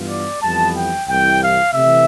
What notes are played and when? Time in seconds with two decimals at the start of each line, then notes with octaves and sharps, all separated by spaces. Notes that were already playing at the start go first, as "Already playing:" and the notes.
Already playing: G2 E3 B3 F4
0.09 D5
0.42 F2 E3 G3 B3 A5
0.75 G5
1.08 C2 C3 E3 G5
1.41 F5
1.74 C3 E3 A3 E5